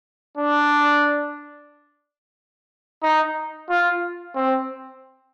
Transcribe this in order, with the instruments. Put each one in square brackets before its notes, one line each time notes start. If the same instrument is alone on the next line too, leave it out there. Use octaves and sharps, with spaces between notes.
[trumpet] D4
D#4
F4
C4